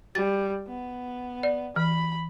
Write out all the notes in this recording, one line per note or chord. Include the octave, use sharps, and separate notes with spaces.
G3 A6
B3
D5
E3 B5